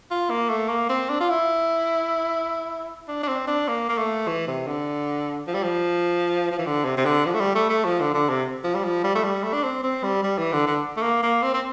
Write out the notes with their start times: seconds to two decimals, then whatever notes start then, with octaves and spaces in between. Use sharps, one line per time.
0.11 F4
0.30 A#3
0.50 A3
0.69 A#3
0.89 C4
1.10 D4
1.20 F4
1.30 E4
3.08 D4
3.23 D4
3.28 C4
3.48 D4
3.68 A#3
3.89 A#3
3.98 A3
4.28 E3
4.48 C3
4.67 D3
5.47 F3
5.55 G3
5.63 F3
6.51 F3
6.59 E3
6.66 D3
6.85 C3
6.97 C3
7.05 D3
7.26 F3
7.34 A3
7.41 G3
7.55 A3
7.70 A3
7.85 F3
8.00 D3
8.14 D3
8.29 C3
8.64 F3
8.75 G3
8.84 F3
9.04 G3
9.15 A3
9.24 G3
9.44 A3
9.53 D4
9.63 C4
9.84 C4
10.04 G3
10.23 G3
10.38 E3
10.53 D3
10.67 D3
10.97 A3
11.02 A#3
11.23 A#3
11.43 C4
11.54 C4